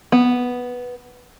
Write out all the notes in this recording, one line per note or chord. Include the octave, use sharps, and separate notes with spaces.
B3